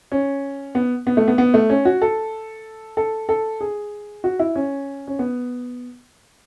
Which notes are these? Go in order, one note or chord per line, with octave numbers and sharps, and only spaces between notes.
C#4
B3
B3
A3
B3
B3
A3
C#4
F#4
A4
A4
A4
G#4
F#4
E4
C#4
C#4
B3